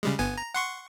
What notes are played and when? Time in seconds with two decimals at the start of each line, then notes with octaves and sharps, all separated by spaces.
0.03 C#3 G3 G#3
0.19 G1 B3 G#5
0.38 A#5
0.54 F#5 C6 C#6